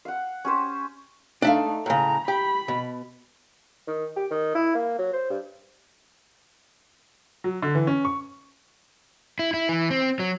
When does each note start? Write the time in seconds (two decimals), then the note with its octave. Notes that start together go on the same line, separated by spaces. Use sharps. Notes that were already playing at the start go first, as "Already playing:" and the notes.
0.05 F5 F#5
0.45 C#4 G4 C5
1.42 A3 D4 D#4 E5 F5
1.86 A2 C#3 A#5
2.28 G4 B5
2.68 B2
3.87 D#3
4.16 G4
4.31 D#3
4.55 E4
4.75 A#3
4.98 F#3
5.13 C5
5.30 G2
7.44 F#3
7.63 D3
7.75 E3
7.87 C#4
8.05 C#6
9.39 E4
9.54 E4
9.69 E3
9.90 C4
10.19 F#3